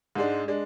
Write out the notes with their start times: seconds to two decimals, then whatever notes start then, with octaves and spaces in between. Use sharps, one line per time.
0.15 G#2 G#3 D4
0.48 G#3 D4